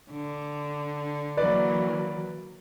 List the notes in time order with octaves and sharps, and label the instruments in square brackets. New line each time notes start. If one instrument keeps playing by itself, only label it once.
[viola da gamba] D3
[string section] E3 F#3 A#3 [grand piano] B4 D5